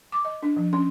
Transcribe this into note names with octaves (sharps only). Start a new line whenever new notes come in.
D6
D#5
D4
F3
C#4